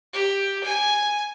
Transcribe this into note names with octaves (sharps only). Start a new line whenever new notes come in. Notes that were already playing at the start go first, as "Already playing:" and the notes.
G4
G#5